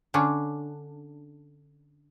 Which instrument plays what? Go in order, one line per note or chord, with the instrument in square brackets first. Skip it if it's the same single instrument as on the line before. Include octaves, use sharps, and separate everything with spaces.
[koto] D3 C#4 D4